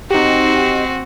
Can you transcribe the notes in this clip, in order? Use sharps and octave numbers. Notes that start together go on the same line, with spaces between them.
C4 D#4 F#4 G4